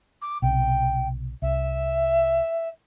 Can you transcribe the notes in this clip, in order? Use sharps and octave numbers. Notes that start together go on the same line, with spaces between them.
D6
B1 C3 G5
C2 E5